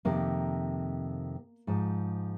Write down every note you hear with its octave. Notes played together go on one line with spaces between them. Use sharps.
F2 C3 D#3 A#3
G#2 F3